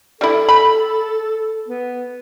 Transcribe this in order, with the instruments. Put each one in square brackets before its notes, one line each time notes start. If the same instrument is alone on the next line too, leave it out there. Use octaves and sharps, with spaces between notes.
[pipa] G3 E4 [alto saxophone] A4
[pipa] B5
[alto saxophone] B3